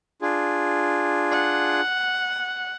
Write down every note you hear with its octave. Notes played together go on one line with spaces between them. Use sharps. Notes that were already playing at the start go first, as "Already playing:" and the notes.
D4 F4 G#4
F#5